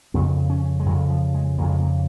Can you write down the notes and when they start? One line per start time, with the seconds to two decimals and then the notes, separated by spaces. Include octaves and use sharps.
0.14 F2 C#3 B3
0.50 C#4
0.80 G#3
0.86 F2 F#3
0.90 C#3
1.10 F3
1.34 G#3
1.58 F2 C#3 A#3
1.69 G#3
1.81 A#3